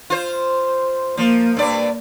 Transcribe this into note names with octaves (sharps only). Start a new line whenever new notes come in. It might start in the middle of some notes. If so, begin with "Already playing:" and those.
F4 C5
F3 A#3
G2 D5